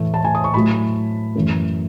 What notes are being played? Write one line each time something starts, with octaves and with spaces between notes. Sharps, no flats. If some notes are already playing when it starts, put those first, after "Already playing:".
Already playing: A2 E3 A3
A5
G#5
D#6
C#6
A2 F#3 A3 B5
F#2 E3 A3